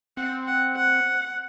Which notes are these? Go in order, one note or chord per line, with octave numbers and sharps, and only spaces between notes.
C4 F#5
F#5
F#5